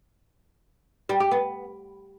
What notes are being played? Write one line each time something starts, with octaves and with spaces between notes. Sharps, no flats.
G3
G4
B3